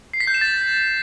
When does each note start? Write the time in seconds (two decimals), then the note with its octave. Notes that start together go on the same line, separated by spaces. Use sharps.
0.14 C7
0.20 B6
0.27 G6
0.34 E7
0.41 A6